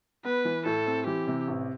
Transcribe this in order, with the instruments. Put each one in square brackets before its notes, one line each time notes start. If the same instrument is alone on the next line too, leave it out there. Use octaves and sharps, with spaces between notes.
[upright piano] B3 [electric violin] B4
[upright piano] E3
[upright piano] A2 [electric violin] A4
[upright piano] C4
[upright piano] E3 [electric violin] G4
[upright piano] C3
A1